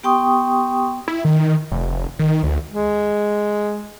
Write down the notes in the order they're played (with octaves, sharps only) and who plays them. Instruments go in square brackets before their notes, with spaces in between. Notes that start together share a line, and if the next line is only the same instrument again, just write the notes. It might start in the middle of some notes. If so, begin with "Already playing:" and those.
[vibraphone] B3 G4 G5 C6 C#6 D#6
[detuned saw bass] E4
D#3
F1
D#3
D2
[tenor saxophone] G#3